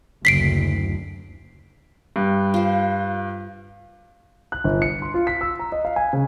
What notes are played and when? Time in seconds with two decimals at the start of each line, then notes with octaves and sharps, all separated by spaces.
0.25 F#1 D2 B6 C7 D7
2.16 G2
2.54 F4 C5
4.52 F#6
4.64 G1
4.82 C#7
5.02 C6
5.14 F4
5.27 B6
5.41 E6
5.59 A#5
5.72 D#5
5.85 F5
5.96 G#5
6.13 C#3